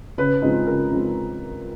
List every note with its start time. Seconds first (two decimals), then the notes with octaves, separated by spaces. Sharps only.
0.18 C#3 B4
0.42 F3 G#3 C4 D#4
0.67 C#3 A#4
0.92 F3 G#3 C4 D#4